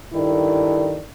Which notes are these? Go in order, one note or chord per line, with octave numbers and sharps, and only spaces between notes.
G2 D#3 E4 A4 D5